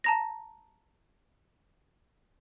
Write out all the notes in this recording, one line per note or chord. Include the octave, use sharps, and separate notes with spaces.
A5 A#5 A#6